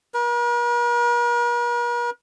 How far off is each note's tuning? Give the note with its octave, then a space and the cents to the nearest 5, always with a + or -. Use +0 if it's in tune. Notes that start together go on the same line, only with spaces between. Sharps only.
A#4 +45